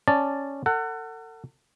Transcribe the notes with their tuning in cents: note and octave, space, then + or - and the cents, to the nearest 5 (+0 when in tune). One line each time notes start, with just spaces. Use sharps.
C#4 +0 D5 +0 A5 +0
A4 +40 F#5 +15